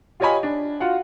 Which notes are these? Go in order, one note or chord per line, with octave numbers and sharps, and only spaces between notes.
F4 G4 C#5 D#5 G#5 B5
D4
F4 F#4 F5 F#5